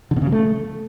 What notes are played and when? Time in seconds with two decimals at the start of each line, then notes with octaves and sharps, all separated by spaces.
0.11 D3
0.16 B2
0.22 C#3
0.27 F#3
0.32 A3